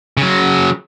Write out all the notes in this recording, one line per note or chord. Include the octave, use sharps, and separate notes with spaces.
C#3 F#3